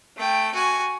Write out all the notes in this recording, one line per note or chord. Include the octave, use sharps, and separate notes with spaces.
A3 G5
F#4 G#5